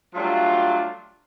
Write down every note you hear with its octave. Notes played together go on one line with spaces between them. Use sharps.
F#3 G3 A3 D4 F4